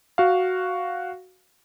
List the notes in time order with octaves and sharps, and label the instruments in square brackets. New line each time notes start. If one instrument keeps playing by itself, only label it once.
[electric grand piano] F#4 F5